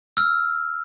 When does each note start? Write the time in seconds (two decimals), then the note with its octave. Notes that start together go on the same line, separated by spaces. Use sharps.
0.17 E6 F6